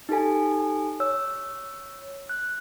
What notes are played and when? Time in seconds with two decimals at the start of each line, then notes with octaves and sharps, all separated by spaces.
0.09 D#4 G4 A4 G#5
1.00 C#5 E6
2.29 F#6